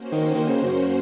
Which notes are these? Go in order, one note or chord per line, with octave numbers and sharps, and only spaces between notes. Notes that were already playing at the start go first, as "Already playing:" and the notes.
Already playing: A#3 C#4 F#4 C5
D#3
D#3
C#3
F#2